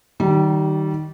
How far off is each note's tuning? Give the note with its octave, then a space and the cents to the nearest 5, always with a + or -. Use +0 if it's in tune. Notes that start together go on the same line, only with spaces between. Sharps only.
D#3 +0 G3 -30